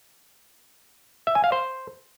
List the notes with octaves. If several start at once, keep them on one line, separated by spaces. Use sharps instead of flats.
E5
G#5
F5
C5